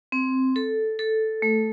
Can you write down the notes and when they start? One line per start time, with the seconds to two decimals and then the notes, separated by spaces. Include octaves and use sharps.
0.12 C4
0.56 A4
0.99 A4
1.42 A3